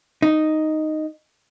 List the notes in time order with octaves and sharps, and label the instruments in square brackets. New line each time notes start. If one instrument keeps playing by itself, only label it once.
[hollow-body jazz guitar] D#4